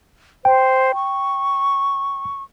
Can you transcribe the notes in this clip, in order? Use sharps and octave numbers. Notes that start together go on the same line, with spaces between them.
C5 G5
C#6